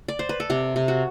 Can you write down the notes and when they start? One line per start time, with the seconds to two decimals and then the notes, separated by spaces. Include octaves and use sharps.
0.08 D5
0.19 C5
0.29 B4
0.40 A4
0.50 C3 G4
0.76 C3
0.88 F#4